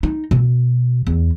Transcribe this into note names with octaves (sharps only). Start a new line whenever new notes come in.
D#4
B2
E2